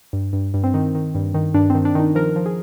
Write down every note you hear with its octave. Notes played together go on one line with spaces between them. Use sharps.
G2
G2
G2
C4
D#3
D#3
G2
D#3
G2 D4
D#3 C4
D4
D#3 D#4
F3 A#4
F3
G#4